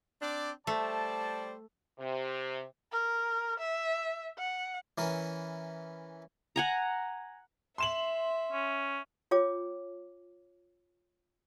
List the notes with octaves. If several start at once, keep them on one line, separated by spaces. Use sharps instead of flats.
C4 D4 D5
G3 A3 C5 D5 A5
C3
A#4
E5
F#5
E3 C#4 A#4
F#5 G#5 A#5
E5 C6 E7 F#7
C#4
F4 C#5 G5 D6